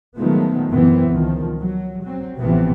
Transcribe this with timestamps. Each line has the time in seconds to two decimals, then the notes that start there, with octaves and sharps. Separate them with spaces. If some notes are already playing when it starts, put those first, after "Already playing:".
0.17 D#3 F3 F#3 G#3 A3 B3
0.71 F#2 E3 B3 C4
1.11 C#2 D#3 F3
1.59 F#3
2.04 F#3 C4
2.39 A1 C3 E3 F3 B3 C4